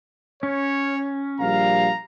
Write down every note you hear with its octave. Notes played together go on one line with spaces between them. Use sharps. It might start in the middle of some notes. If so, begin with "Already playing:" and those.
C#4 C#5
A#1 G3 F5 A#5